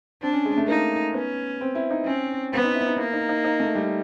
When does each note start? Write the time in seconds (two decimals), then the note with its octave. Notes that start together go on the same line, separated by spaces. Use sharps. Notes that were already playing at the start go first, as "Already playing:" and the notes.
0.23 C4 D4
0.33 C#4
0.45 G#3
0.57 A3
0.68 A#3 D#4
1.14 B3 C#4
1.61 C4
1.75 E4
1.90 D#4
2.06 C4 C#4
2.52 B3 C4
2.64 D#4
2.75 E4
2.87 D#4
2.98 A#3 E4
3.13 D#4
3.29 D#4
3.45 D#4
3.60 A3
3.75 G3